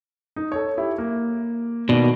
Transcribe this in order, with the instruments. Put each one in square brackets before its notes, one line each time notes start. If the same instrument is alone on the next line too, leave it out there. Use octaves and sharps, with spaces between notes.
[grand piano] D#4
A4 C#5
E4 G4
A#3
[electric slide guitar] B2 [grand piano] D#3 A#3 D5